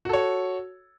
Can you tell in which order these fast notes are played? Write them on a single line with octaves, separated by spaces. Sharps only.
F#4 A4 C#5